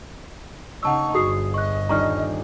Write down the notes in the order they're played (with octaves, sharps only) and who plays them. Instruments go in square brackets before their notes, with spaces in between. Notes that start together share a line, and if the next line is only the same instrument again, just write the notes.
[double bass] C#3 D#4 [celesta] F#5 A5 E6 [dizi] C#6
[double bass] G1 [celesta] F#4 D#6 C7 [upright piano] G#4
[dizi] D#5 [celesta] C#6 F#6
[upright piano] D#1 D4 D#4 [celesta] A#5 C#6 F6